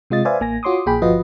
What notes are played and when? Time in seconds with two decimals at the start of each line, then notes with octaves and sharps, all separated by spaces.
0.10 C3 G#3 F4 D#5 A6
0.25 B4 C5 D5 E5 F5 G#5
0.40 A1 A#3 G#5 A#6
0.63 F4 F#4 C#5 C6 D6 D#6
0.86 A#1 A#2 G#4 G5 B5
1.02 G1 F3 F4 F#4 B4 D#5